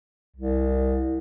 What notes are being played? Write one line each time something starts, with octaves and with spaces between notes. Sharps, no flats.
C2